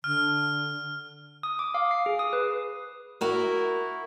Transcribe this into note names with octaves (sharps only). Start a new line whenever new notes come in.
D3 F6
D#6
D6
F5
C7
G#4
D#6
B4
E4 F#4 A#4